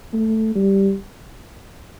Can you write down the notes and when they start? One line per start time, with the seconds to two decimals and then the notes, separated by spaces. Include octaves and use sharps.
0.13 A3
0.55 G3